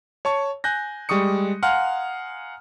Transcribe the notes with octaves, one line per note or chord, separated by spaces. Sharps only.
C#5 A5 C#6
G#5 F#6 G6 A#6
G3 G#3 C#6 D#6 C#7
F5 F#5 G#5 A#5 C6 F6